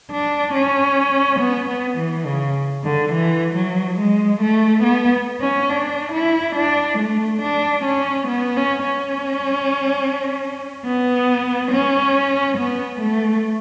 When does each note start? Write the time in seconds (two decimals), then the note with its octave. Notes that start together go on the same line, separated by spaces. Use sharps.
0.11 D4
0.54 C#4
1.40 B3
1.69 B3
1.98 E3
2.26 C#3
2.84 D3
3.13 E3
3.55 F#3
3.99 G#3
4.41 A3
4.84 B3
5.41 C#4
5.70 D4
6.13 E4
6.56 D4
6.98 A3
7.42 D4
7.85 C#4
8.28 B3
8.57 C#4
8.85 C#4
10.86 B3
11.72 C#4
12.58 B3
13.01 A3